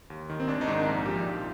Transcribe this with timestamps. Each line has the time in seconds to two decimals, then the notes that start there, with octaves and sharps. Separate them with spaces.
0.10 D#2
0.30 D#3
0.40 C4
0.47 G#1 D4
0.61 D#4
0.67 G#2 D#3 D4
0.86 A#1 D#4
1.05 A#2 F3 G4
1.24 A#1 G4
1.34 F4